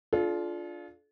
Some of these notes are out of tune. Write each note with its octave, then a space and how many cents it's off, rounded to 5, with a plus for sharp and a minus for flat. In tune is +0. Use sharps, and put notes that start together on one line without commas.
D4 +0 F4 +0 A4 -40